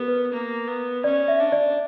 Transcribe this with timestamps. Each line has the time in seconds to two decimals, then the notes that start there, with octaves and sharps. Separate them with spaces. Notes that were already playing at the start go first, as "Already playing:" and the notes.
Already playing: B3 G4 A#4
0.08 B4
0.33 A#3
0.68 B3
1.04 C#4 D5
1.28 E5
1.40 D4
1.52 D5